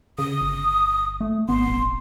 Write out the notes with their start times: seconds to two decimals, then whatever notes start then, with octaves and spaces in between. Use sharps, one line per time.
0.19 C#3 D#6
0.41 G1
1.20 A3
1.49 G#1 B3 C6
1.66 D#1